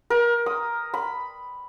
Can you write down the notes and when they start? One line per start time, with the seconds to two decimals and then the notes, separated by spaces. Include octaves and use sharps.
0.10 A#4
0.46 D#6
0.94 B5